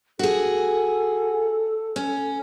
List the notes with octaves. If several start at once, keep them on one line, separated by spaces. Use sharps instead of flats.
F#4 G#4 A4
C#4